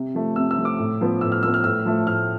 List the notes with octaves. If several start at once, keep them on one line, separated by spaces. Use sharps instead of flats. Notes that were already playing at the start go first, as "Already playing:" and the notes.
Already playing: C3
F3 A3
C3 E6
E6
F3 A3
D6
A2
F3 B3
A2 E6
F6
F3 B3 E6
F6
A2 E6
F3 A3
A2 F6